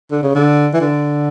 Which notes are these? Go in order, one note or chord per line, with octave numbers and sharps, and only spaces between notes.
D3
C#3
D3
E3
D3